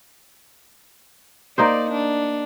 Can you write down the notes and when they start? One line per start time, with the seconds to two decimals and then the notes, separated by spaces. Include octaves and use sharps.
1.58 A#3 D#4 C5 D5
1.91 D4